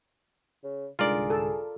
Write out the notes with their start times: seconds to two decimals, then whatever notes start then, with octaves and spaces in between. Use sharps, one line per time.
0.64 C#3
0.99 C2 G#2 D3 F4 G#4 A#4 D5
1.30 A4